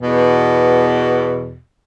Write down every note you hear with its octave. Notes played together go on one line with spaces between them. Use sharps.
E2 B2